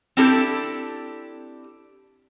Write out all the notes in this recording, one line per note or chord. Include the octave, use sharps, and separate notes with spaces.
C4 D4 E4 G4 A4